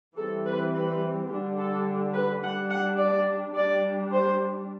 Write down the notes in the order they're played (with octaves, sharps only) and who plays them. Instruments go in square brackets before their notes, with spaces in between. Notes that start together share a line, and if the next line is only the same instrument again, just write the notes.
[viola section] E3 G3 C4 A4
B4
B4
D3 G3 D4 G4
A4
B4
G3 D4 F#5
F#5
D5
G3 D4 D5
C5